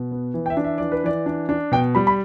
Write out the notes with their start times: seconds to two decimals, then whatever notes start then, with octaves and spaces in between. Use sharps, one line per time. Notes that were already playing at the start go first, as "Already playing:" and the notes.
Already playing: B2
0.11 B3
0.34 E3
0.46 G5
0.50 E5
0.57 D4
0.64 E5
0.78 E3 D5
0.92 B4
1.04 E3 D5
1.26 D4
1.49 D4
1.72 B2 G5
1.95 G3 B5
2.07 B5